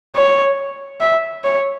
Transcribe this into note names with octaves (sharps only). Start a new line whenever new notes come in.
C#5
E5
C#5